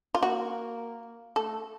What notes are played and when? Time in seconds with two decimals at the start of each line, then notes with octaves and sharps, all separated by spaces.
0.15 F4
0.22 A#3 F#4
1.36 A3 A4